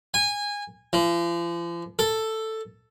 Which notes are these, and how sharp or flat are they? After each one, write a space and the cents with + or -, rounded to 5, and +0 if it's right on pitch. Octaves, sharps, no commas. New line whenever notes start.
G#5 -20
F3 -40
A4 +5